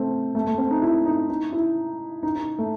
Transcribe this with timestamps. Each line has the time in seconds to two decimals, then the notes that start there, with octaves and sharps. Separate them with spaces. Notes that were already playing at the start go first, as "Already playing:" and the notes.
Already playing: A3 C4
0.35 A3
0.47 A3
0.58 C4
0.70 D#4
0.82 E4
1.05 D#4
1.29 D#4
1.52 E4
2.23 D#4
2.35 D#4
2.59 A3